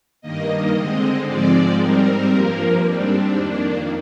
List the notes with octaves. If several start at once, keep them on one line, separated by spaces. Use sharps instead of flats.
G2 D#3 A#3 D#5
D3 G#3 C4
G#2 F3 G#3 C4 D5
G#2 G3 C4 A#4
G2 F3 A#3
G#2 G3 C4 D4
F2 D#3 A#3